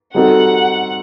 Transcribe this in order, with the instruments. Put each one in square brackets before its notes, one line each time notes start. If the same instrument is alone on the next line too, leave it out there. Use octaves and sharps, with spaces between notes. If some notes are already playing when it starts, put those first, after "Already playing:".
[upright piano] G3 C4 D#4 F#4 A4 [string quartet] F#5